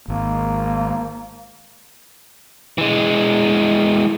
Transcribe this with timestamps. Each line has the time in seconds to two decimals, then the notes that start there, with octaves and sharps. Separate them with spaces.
0.08 G#1 A#3
2.78 E3 G#3